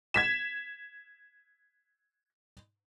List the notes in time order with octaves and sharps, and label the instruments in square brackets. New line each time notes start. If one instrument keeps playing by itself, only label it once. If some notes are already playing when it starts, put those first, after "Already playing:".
[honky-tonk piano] G#6 B6 E7